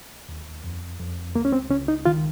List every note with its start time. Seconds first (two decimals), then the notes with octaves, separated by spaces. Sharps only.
0.29 D#2
0.64 F2
1.00 F2
1.35 C#2 A#3
1.45 C#4
1.52 C4
1.70 C#2 C#4
1.88 D#4
2.06 D#3 F4